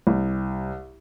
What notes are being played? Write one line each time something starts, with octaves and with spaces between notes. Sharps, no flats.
C2